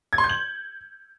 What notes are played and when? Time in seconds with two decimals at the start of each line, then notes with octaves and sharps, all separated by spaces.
0.13 G#6
0.18 C6
0.24 G6
0.30 F#7